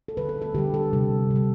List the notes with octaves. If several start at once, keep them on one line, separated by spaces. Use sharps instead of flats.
A4
D3 G3 B4
A4
A4
D3 G3 G4
A4
C3 G3
C3
G3